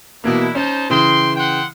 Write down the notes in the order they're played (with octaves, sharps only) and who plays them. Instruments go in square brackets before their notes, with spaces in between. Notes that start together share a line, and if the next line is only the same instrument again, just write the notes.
[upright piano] B2 E3 A#3 [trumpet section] D4 E4
[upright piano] C#4 [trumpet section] D#4 C5 A5
[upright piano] C#3 E3 [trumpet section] G5 C6
[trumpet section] F#5 G5 C6